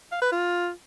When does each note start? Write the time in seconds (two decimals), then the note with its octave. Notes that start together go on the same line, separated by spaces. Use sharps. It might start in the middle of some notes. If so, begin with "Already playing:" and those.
0.12 F5
0.22 B4
0.32 F4